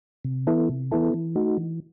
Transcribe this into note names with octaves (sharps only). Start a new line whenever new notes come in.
C3
E3 B3 E4 A4
C3
E3 B3 E4 A4
E3
A3 D#4 F#4
E3